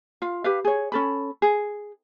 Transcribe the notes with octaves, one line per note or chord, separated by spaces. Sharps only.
F4 F5
G4 B4 F5
G#4 C#5
C#4 A4 B5
G#4